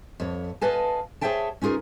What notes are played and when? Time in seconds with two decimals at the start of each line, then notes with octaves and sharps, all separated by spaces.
0.20 F2 C#5
0.61 B4 D#5 F5 G#5 A5
1.21 G#4 C5 C#5 E5 G5 A5
1.62 C#4 D#4 F4 G#4 A#4